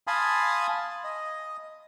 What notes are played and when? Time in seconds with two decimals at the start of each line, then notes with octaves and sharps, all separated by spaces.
0.07 F5 G#5 A5 B5 C6 D#6
1.04 D#5